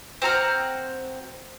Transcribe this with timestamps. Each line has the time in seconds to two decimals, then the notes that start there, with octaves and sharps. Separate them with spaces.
0.22 C4 F#4 A#5 F6